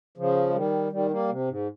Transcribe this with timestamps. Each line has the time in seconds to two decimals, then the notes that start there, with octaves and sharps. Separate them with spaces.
0.18 C#3 F3
0.50 G#3
0.55 D#3 G3
0.92 D#3 G3
1.11 G3 A#3
1.30 C3
1.48 G#2